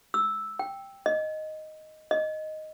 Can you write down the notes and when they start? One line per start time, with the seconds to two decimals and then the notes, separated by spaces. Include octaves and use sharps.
0.14 E6
0.59 G5
1.06 D#5
2.11 D#5